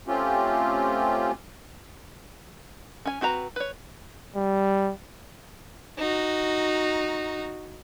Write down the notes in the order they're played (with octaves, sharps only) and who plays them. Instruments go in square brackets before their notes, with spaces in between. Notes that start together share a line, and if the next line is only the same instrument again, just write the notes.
[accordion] A3 C4 C#4 F4 G4
[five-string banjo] C#4 G#5
C4 F#4 B4 A#5
B4 C#5
[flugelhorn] G3
[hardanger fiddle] D#4 F#4